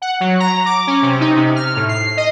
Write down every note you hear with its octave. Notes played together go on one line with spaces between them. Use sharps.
F#5
F#3
A#5
D6
C#4
C3
D#4
C3
F6
A2
C7
D#5